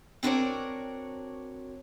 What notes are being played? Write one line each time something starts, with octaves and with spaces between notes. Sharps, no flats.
C4 D4 F#4 A#4 C#5 D5